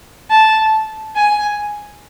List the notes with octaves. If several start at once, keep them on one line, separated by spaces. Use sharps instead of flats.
A5
G#5